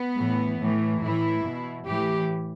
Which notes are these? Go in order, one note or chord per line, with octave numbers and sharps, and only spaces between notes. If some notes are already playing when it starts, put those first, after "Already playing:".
Already playing: B3
A2 E3
A2 E3
A2 E3 E4
B2
A2 E3 G4